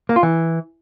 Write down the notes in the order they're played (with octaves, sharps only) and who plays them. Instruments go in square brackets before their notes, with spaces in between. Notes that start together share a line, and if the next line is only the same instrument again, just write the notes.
[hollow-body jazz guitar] A#3
F4
E3